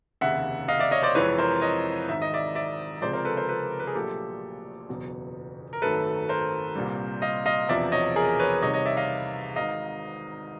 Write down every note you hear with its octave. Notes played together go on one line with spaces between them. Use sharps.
F1 D#2 C#3 E5 F#5
D#5 F5
D5 E5
C#5 D#5
C5 D5
F2 C3 E3 G#3 B4 C#5
A#4 C5
C#5 D#5
G#1 G#2 D#3 E5
D#5
D5 E5
D5 E5
C#2 C3 F3 G#3 C5 D5
A#4 C5
A4 B4
A#4 C5
A4 B4
A#4
B4
G#4 A#4
A#1 A#2 F#3 A3 G4 A4
F#1 E2 B2 F#3
A#4
G#1 F#2 D#3 F#3 A3 A4 B4
A#4 C5
C2 A#2 G3
D#5 F5
D#5 F5
E1 E2 C3 F3 D5 E5
C#5 D#5
G#4 A#4
B4 C#5
C2 C3 D#3 G3 C#5 D#5
C#5 D#5
D5 E5
D#5 F5
G#1 G#2 D#3 D#5 F5